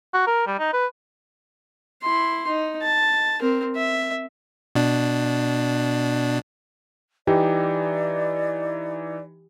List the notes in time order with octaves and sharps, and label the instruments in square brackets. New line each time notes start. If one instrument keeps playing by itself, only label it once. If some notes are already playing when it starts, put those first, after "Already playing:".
[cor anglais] F#4
A#4
G3
D#4
B4
[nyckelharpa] E4 C6
D#4
A5
C4 A#4
E5
[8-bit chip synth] B2 D4
[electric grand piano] E3 D#4 [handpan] G4 [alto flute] D5